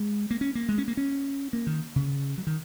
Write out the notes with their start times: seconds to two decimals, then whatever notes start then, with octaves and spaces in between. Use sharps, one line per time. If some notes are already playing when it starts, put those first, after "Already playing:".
Already playing: G#3
0.30 A#3
0.41 C#4
0.55 A#3
0.69 G#3
0.78 C#4
0.88 A#3
0.97 C#4
1.53 A#3
1.67 D#3
1.96 C#3
2.38 F#3
2.47 D#3